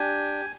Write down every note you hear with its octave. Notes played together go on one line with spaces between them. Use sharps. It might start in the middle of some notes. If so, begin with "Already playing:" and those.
Already playing: D4 G4 G#5